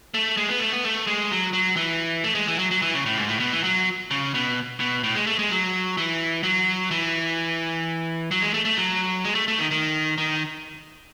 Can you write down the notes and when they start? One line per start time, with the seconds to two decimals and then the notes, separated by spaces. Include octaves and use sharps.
0.14 A3
0.37 G#3
0.49 B3
0.60 A3
0.72 B3
0.84 A3
1.07 G#3
1.31 F#3
1.53 F#3
1.76 E3
2.24 A3
2.35 G#3
2.48 E3
2.59 F#3
2.71 F#3
2.82 E3
2.94 C#3
3.06 A2
3.17 G#2
3.28 A2
3.40 B2
3.53 E3
3.64 F#3
4.11 C#3
4.34 B2
4.80 B2
5.03 A2
5.15 G#3
5.27 A3
5.39 G#3
5.51 F#3
5.97 E3
6.43 F#3
6.91 E3
8.31 F#3
8.42 G#3
8.54 A3
8.65 A3
8.77 F#3
9.24 G#3
9.35 A3
9.48 A3
9.59 D#3
9.71 D#3
10.18 D#3